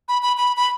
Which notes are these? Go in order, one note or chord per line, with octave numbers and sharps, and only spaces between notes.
B5
B5
B5
B5